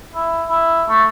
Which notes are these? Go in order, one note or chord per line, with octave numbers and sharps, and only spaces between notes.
E4
E4
A3